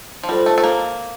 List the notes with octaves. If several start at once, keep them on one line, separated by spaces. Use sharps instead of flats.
F3
G3 F4 A4 C5
A3
A3
A#3